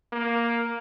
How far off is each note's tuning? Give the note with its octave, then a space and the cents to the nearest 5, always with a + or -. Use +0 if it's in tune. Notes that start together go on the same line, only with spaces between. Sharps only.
A#3 +5